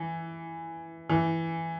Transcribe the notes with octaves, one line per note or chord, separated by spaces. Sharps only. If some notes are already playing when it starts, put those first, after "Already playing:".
Already playing: E3
E3